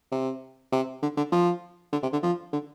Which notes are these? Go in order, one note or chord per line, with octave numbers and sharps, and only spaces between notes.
C3
C3
D3
D3
F3
D3
C3
D3
F3
D3